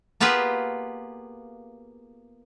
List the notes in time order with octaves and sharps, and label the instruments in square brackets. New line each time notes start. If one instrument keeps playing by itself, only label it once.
[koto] A#3 B3 F4 G4 G#4 B4